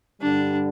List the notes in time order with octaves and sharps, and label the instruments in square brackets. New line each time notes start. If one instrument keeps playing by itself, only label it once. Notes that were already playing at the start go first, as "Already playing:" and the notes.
[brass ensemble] G2 D3 G3 [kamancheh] D4